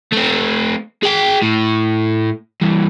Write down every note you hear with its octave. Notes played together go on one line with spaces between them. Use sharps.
A3 C4
G#4 G5
A2
G2 E3